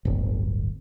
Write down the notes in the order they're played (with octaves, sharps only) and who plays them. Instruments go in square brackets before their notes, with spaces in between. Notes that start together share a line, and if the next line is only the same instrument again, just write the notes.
[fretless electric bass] D1 G1